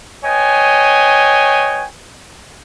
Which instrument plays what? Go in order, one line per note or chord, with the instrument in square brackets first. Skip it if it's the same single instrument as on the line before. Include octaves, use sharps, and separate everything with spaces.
[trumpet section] B4 C#5 D#5 G5 G#5